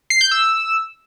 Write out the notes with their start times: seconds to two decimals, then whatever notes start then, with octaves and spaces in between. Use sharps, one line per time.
0.10 C7
0.21 G6
0.31 E6